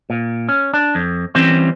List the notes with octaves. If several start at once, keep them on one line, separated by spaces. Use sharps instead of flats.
A#2
C#4
D4
F2
E3 G3 C4 C#4 C5